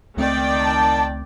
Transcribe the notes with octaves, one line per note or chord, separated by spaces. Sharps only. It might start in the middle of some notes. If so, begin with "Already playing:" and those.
C#2 D#3 A3 C4 D5 G5
A5